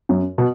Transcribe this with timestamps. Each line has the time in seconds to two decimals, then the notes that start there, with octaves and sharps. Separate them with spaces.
0.09 F#2
0.38 B2